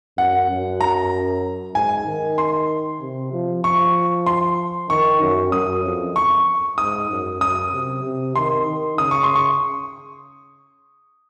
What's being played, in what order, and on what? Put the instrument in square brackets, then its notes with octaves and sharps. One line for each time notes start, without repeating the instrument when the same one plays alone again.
[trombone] F#2 [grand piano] F#5
[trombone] F#2
[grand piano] A#5
[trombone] G#2 [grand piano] G#5
[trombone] D#3
[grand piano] C6
[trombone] C3
F3
[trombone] F3 [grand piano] C#6
[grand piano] C6
[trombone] D#3 [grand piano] C#6
[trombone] F#2
[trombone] F#2 [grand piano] D#6
[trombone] F2
[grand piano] C#6
[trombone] G#2 [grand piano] D#6
[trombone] F#2
[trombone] F#2 [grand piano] D#6
[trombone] C3
C3
[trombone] D#3 [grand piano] C6
[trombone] D#3
[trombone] C#3 [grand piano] D#6
[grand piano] C#6
C6
C#6